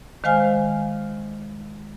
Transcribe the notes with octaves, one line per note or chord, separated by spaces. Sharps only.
D#3 G#3 C5 F5 G#5 F6